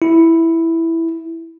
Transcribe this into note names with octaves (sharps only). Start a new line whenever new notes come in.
E4